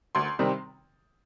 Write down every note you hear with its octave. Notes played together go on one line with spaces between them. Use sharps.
D2 C6
C3 D#3 G3 C4